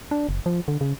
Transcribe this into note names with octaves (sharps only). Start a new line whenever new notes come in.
D4
F#1
F3
D3
C#3